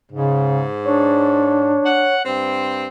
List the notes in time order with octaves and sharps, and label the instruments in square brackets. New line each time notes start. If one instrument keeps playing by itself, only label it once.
[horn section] G#2 [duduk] C#3
[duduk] D4 [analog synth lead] C#5
[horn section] F#5
G2 C4